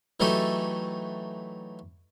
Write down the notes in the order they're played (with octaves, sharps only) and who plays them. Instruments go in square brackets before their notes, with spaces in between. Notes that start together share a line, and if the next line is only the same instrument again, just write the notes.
[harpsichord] E3 F#3 A3 D#4 G4 A4